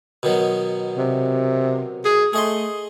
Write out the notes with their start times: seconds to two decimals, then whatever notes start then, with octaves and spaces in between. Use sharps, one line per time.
0.23 B2 D#3 F#3
0.97 C3
2.05 G#4
2.33 A3 G#4 D#5 C6